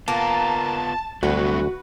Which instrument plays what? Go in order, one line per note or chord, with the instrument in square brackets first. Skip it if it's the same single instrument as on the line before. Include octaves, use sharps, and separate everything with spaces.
[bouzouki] A#3 [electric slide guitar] B3 F4 [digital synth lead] A5
[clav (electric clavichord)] D2 [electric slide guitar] F#3 G3 C4 [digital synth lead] F#4 [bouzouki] B4